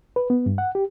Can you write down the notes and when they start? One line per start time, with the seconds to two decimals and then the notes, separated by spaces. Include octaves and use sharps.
0.16 B4
0.30 B3
0.46 G2
0.58 F#5
0.75 G4